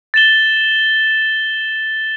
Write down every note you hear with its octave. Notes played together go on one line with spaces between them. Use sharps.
A6 E7 G7